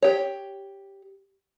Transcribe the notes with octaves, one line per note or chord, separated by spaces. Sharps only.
G4 C#5